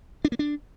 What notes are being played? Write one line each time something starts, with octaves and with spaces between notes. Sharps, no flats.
D4
A#3
D4